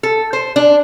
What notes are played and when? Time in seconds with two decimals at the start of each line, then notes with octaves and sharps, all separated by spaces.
0.03 A4
0.33 C5
0.56 D4